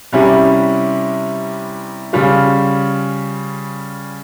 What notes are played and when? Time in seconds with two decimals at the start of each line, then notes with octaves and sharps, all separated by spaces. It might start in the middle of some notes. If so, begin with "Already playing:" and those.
0.13 C3 G3 C#4 E4 G4
2.13 C#3 G3 C#4 F4